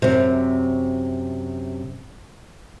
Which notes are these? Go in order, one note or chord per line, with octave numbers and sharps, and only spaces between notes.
F#2 C3